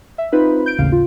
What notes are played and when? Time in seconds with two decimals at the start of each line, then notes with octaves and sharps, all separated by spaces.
0.18 E5
0.32 C4 D#4 F4 B4 C5 B5
0.66 G6 D7
0.78 A1 D#2 A2 C#3 F5
0.92 F4